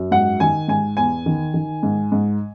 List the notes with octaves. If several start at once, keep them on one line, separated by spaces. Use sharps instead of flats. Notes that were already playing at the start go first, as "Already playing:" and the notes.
Already playing: F#2
G#2 F#5
D#3 G#5
G#2 G#5
E2 G#5
D#3
D#3
G#2
G#2